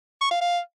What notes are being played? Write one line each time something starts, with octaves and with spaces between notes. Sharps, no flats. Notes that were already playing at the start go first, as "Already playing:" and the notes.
C#6
F5
F5